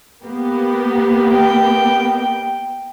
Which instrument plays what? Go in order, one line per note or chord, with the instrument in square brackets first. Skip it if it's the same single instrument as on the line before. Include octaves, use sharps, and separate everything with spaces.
[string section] A#3 B3 G4
[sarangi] G5